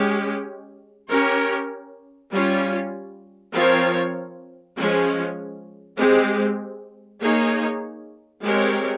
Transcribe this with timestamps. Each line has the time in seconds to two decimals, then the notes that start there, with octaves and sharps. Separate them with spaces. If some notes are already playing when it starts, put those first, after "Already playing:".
Already playing: G#3 C#4 G4
1.09 C#4 G4 A#4 C#5
2.31 G3 C#4 F4
3.54 F3 C4 F4 A#4 C#5
4.76 F3 G#3 C#4
5.98 G#3 C4 G4
7.21 A#3 D#4 G#4 C#5
8.43 G#3 C4 G4 A#4 C#5